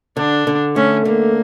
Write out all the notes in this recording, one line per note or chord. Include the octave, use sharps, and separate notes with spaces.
D3 D4
D3
A3 C#4
D3 A#3